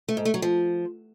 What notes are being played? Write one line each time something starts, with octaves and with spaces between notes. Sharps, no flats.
A3
G#2
A3
F#3
F3